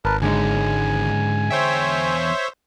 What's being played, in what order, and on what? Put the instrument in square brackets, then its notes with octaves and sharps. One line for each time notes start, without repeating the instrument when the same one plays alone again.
[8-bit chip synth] G#1 [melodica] A#4 B4 A5
[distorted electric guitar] G#2 C#4 [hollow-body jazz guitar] D3 G#3 D#4 [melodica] G#5
[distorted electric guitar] E2 G5 [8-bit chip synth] C5 C#5 E5